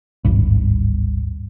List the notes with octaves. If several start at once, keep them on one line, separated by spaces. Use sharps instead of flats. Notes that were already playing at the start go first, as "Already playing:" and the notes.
D1 G#1 G2